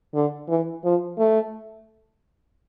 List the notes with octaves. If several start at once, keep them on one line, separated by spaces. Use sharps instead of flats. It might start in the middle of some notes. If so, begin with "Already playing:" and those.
D3
E3
F3
A3